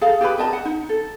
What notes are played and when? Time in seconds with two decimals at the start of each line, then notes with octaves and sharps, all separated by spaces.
0.01 G#4 A4 F5
0.21 G4 G#4 B4 B5
0.38 A#4 D#5 A5
0.53 F#5
0.65 D#4
0.89 A4